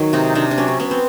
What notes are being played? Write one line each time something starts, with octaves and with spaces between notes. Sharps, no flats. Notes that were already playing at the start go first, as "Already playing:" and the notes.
Already playing: D#3 F#3
C3 D#4
C3 D4
D4
F#3 C#4
C#4
B3 C#4
C4